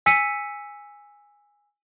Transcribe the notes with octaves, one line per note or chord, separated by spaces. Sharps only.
G#5 E6 B6 C#7 D#7